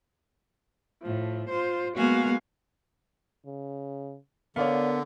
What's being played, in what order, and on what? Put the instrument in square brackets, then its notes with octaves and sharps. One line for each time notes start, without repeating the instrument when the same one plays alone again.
[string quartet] A2 F3
F4 C5
G#3 A#3 B3 F#4 F5 G#5
[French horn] C#3
[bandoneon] D3 [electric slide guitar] B3 [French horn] A#4 [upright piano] C#5 D5 F5